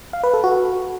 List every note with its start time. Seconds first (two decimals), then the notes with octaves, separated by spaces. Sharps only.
0.13 F5
0.23 B4
0.34 A4
0.44 F#4